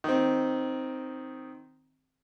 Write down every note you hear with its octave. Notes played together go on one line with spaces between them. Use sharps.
D#3 C4